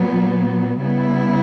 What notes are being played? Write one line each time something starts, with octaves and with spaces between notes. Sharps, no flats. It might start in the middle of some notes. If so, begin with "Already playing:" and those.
Already playing: A#2 F#3 B3
C#3 G3 B3 E4